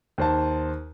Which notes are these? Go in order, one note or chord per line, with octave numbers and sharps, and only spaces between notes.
D#2 C5 A5